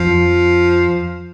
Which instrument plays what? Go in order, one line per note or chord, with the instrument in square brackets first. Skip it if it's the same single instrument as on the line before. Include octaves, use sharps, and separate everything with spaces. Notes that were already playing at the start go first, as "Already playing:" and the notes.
Already playing: [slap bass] F2 [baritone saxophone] F3